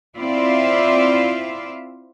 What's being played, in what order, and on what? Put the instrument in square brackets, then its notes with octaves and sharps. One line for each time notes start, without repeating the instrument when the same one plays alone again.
[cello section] C4 E4 F4 D5 E5 F5